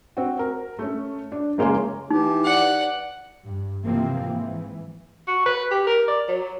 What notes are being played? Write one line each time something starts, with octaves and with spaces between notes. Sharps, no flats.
C4 F#4
A#4
A3 C#4
D4
F#1 G#3 A#3 C#4 G#5 C6
E3 D#4 G4
D5 F#5
G2
C3 E3 F3 A#3 C4
G#2 E3
F#4
B4
G4
A#4
D5
F#3